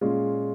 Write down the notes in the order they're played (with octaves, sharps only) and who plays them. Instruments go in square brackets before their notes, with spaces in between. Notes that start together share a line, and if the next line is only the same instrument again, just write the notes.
[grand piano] A#2 G#3 C#4 F4